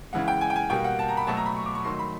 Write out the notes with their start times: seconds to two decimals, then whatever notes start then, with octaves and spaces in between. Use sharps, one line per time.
0.13 C#3 E3 G#3 F#5
0.28 G5
0.41 G#5
0.50 G5
0.56 G#5
0.69 B2 G3 A#3 G5
0.84 F#5
0.99 A5
1.08 A#5
1.17 B5
1.27 B2 F#3 A3 A5
1.37 A#5
1.46 B5
1.56 C#6
1.66 D6
1.75 C#6
1.84 D#3 F#3 A3 C6
1.99 B5